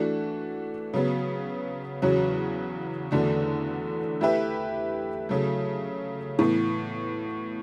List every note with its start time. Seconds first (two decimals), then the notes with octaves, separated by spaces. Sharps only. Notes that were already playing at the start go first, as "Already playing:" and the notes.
Already playing: E3 A3 D4 F#4
0.93 C#3 F#3 B3
2.02 E2 C#3 F#3 C#4 F#4
3.11 E2 D3 A3 D4 F#4
4.21 A3 E4 G4 B4 E5
5.29 C#3 F#3 A3
6.39 A2 E3 B3